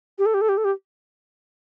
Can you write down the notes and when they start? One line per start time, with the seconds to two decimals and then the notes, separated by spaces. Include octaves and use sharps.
0.19 G4
0.26 A4
0.34 G4
0.41 A4
0.49 G4
0.57 A4
0.64 G4